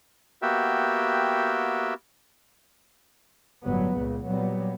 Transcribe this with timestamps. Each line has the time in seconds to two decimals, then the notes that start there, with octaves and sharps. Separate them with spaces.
0.42 A#3 B3 F#4 G4 E5 G5
3.64 G1 A2 F#3 B3
3.96 C#2 A#2 C#3
4.26 A#2 F#3 G3 B3